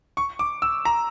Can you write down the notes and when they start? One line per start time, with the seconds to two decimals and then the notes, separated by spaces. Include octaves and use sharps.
0.17 C#6
0.39 D6
0.62 E6
0.85 A#5